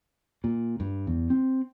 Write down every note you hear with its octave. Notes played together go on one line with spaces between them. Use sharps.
A#2
G2
E2
C4